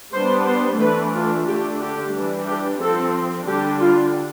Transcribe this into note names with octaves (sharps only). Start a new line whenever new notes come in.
G3 B3 D4 C5
C5
E3 A3 D4 B4
F4
D3 A3 D4 G4
G4
E3 G3 D4
G4
F3 C4 A4
D3 G3 D4 G4
F4